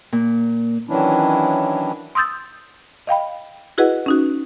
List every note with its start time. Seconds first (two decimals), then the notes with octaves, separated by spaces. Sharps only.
0.12 A#2
0.89 D#3 E3 F#3 C#4 D4 E4
2.15 C6 D#6 E6 G6 A6
3.07 D#5 F5 G5 B5
3.78 E4 F#4 G#4 B4 D#5 F#5
4.06 C#4 D#4 F#4